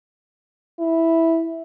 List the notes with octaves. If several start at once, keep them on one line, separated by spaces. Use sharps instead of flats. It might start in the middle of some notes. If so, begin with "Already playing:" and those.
E4